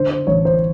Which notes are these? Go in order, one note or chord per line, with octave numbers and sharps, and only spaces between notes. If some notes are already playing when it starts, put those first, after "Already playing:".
Already playing: D3 C5
C5
A1 C#5
C5